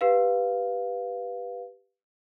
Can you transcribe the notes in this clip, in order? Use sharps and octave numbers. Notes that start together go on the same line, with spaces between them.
G4 B4 F5